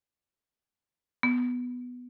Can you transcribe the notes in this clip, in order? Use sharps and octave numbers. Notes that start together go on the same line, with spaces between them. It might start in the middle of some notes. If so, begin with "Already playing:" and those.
B3